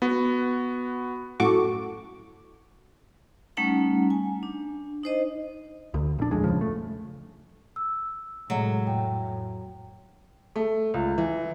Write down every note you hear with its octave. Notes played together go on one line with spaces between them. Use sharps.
B3 F#4
F#2 A2 F#4 A4 C#6 D6
G3 A3 C#4 D#4 F#5 A#5
G#5
D4
D#4 C5 D#5
D2
A#1 D4
A1 F2 G#3
D#1 D2 C#3 F3
A3
E6
A2 C3 F#3 G#3 A3
F2 G5
A3
C#2
E3